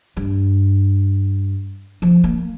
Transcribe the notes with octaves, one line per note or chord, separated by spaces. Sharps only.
G2
F3
A#3